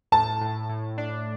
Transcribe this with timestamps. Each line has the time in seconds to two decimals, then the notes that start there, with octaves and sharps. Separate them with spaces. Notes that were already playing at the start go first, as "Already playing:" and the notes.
0.12 A2 A5
0.41 A2
0.69 A2
0.98 D4